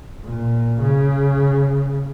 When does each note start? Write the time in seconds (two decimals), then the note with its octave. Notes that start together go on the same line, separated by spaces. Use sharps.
0.24 A#2
0.81 C#3